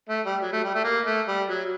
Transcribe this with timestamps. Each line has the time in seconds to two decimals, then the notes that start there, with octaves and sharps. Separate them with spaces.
0.09 A3
0.26 G3
0.42 F#3
0.53 A3
0.64 G3
0.75 A3
0.84 A#3
1.06 A3
1.28 G3
1.49 F#3